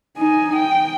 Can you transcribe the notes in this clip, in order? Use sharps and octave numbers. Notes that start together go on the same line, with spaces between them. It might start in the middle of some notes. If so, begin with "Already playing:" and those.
D#4 G#5
G5